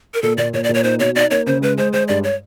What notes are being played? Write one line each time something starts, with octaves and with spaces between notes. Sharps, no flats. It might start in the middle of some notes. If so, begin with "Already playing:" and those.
A#4
A#2 A4
A#2 D5
A#2 C#5
D5
A#2
C#5
D#4 C5
B2 C#5
D#4 D5
A#3 C#5
C#3 C5
G#3 B4
G#3 C5
G#3 C5
G2 D5
C#5